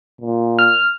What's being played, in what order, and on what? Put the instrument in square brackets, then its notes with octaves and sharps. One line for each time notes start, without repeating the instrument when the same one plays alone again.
[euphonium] A#2
[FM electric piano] F6